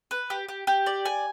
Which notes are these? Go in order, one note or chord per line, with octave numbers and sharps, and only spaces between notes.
B4
G4
G4
G4
D5
G#5